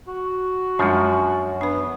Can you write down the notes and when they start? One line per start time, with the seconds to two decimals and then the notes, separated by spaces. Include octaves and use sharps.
0.08 F#4
0.79 F#2 F3 G#3 D4
1.61 B3 D4 B4